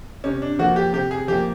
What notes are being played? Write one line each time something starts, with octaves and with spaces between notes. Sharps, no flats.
C3 C#4
D4
F3 A#3 F#4
G4
C3 G4
G#4
F3 A#3 G4